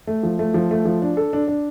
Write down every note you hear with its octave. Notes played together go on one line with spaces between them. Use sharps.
A3
F3
A3
F3
A3
F3
D4
A4
D4
D4